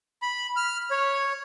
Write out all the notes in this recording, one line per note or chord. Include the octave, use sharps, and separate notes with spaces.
B5
F6
C#5